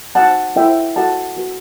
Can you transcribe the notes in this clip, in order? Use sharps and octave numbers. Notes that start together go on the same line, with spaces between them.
D#4 F#4 C5 F#5 A5
E4 A4 C5 E5 G5
F#4 A4 C5 F#5 A5
F#4 B4